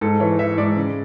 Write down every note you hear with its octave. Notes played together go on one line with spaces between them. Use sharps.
G#2 A4
E3 C#5
E3 E5
G#2 D5
C#3